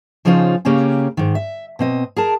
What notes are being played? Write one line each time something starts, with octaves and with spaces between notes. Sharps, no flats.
C#3 F3 C#4 D#4 F4 C5
C#3 A#3 C#4 G4 G#4
G#2 D#3
E5
B2 C4 D#5
G#4 A#4 A5